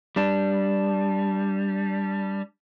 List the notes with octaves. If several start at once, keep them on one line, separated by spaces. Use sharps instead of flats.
G3 D4